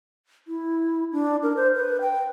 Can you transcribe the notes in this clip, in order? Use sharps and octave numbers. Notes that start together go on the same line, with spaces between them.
E4
D4
A#4
C5
B4
G5